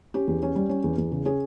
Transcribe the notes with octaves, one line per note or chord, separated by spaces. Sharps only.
C#4 G4
E2
C#4
G3
C#4
E2
E2
C#3
C#4 G#4